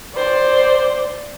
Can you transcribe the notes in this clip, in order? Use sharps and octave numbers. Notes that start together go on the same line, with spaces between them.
C5 D5